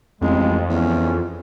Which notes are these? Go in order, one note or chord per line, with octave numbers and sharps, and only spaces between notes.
A1 F2 G#3
E2 C#4